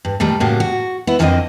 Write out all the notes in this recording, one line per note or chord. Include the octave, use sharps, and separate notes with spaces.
G2
A#2 D#3 G3 A3
A2 C#3 A#3 F#4 G4
F#4
B3 E4
F2 D3 A#3 C4 A4 D#5